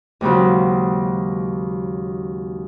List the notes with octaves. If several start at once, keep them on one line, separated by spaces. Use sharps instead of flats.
D#2 G#2 C#3 F#3